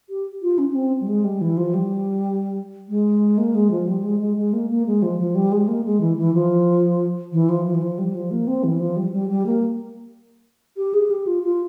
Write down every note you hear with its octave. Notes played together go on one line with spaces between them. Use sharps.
G4
F4
C#4
C#4
C4
G3
G#3
G3
E3
F3
G3
G#3
A#3
G#3
F3
G3
G#3
G#3
G#3
A#3
A#3
G#3
F3
F3
G3
G#3
A#3
G#3
E3
E3
F3
E3
F3
F3
E3
F3
G3
F3
A#3
C4
E3
F3
G3
G3
G3
A#3
G4
G#4
G4
F4
F4